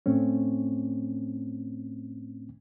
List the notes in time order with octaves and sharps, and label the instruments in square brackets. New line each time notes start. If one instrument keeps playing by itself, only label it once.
[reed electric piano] A2 A3 C4 C#4